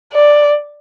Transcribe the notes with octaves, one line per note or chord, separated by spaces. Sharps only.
D5